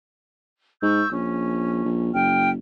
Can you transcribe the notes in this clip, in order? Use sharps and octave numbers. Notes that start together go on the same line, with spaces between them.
G#2 C#6 E6 G6
A#1 C#4
A#1
F#1 G5 F6